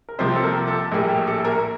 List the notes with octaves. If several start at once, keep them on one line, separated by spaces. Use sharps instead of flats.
A#4
C2 C3 F3 A#3 C4 C5
G4
A4
A#3 A#4
A4
A#1 A2 G3 A#3
G4
A4
A#3 A#4